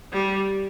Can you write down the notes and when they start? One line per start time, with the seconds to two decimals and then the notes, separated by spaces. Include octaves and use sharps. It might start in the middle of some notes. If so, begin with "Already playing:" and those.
0.13 G3